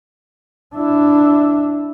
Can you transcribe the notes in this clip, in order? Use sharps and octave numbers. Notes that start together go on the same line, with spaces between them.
D4 E4